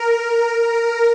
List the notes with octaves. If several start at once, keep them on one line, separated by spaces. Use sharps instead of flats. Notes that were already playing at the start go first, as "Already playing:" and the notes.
Already playing: A#4
A#4